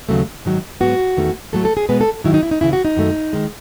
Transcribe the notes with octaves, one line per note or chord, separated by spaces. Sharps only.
D#2 C#3 F#3 A3
G#2 D#3 F#3
G#2 F#3 B3 F#4
E2 D#3 A3
A2 F#3 A3 A4
A4
G#4
B2 G#3 B3 B4
A4
G#2 D#3 F#3 E4
D#4
E4
D#4
D#2 C#3 E3 E4
F#4
D#4
F#2 D#3 F#3 A3
D#3 G#3